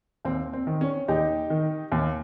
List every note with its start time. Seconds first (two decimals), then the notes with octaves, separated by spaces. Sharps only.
0.25 D#2 C4
0.53 C4
0.67 D#3
0.81 C#4
1.08 D#2 D#4 G4
1.50 D#3
1.92 D#2